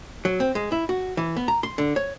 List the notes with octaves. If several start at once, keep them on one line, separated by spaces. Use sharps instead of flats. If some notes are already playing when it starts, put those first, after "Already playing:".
F#3
C4
G#3
E4
F#4
E3
B3
A#5
C6
D3
C#5